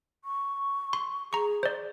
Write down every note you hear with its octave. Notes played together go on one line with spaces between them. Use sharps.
C#6
C6
G#4 A#5 C#6
C5 D5